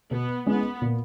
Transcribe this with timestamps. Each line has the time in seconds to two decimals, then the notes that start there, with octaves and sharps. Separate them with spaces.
0.11 B2 B3
0.46 G#3 B3 C#4 E4
0.82 A#2